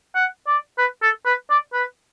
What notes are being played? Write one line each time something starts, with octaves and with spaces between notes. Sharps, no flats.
F#5
D5
B4
A4
B4
D5
B4